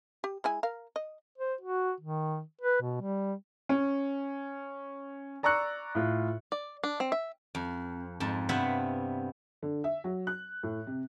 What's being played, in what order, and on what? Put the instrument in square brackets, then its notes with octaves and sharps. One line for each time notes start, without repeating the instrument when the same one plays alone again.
[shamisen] G4
G#3 E4 G#5
A#4 F5
D#5
[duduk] C5
F#4
D#3
B4
B2
G3
[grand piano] C#4
D5 A#5 C#6 E6 F#6 C#7
A2 F4
[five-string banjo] D5
D4
C4
E5
[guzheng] F2
F2 G#2 A5
G2 C3 B3 F4 E5 F#5
[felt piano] D3
E5
F#3
F#6
A2
C3